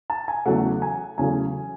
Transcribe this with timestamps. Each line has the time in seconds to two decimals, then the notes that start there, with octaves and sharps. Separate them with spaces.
0.10 A5
0.28 G#5
0.46 E2 C#3 F#3 A3 F#5
0.82 G#5
1.18 E2 C#3 F#3 A3 G#5